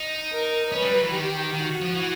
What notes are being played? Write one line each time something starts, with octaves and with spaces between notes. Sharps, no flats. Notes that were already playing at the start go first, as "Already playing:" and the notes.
Already playing: D#4
A#4
C#4 B4
G3
F#3
E3
D#3 G4
D#3 F#4
F3
E3